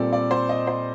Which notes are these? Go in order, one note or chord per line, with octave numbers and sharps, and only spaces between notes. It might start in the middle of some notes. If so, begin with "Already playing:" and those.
Already playing: A#2 G3 C4 A4 D5
D5
C5
D#5
C5